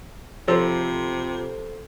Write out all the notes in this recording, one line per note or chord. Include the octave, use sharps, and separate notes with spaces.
C3 F3 F4 G#4 A4 C5